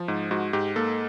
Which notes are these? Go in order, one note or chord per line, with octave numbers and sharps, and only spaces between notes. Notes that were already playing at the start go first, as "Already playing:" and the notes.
Already playing: F3
G#2
G#2 F#4
G#2 G4
A#3 A4